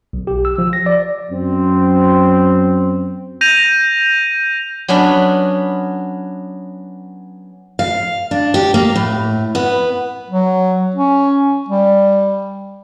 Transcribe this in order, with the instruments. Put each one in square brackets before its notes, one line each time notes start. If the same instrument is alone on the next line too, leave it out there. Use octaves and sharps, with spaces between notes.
[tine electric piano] B1
G4
E6
F3
A#6
D5
[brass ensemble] F#2 C4
[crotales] G6 A#6 D#7 F7
[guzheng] F#3 B3 C#4 D4 B5
[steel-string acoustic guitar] F5
D4
G4
A#3
A2
B3
[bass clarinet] F#3
C#4
G3